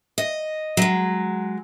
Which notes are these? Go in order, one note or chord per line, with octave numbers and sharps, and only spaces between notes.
D#5
F#3 G#3